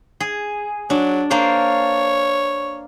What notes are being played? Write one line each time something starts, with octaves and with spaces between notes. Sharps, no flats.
G#4
F#3 D4
A#3 D4 C5 C#5